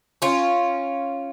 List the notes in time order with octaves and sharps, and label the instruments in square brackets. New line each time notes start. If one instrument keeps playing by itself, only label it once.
[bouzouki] C#4 F4